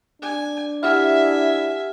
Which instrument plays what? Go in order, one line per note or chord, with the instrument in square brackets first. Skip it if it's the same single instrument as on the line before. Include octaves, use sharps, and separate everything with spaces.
[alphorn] D4 [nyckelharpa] G#5
[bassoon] E4 [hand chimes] G4 F#5 F6 [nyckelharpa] E5 G#5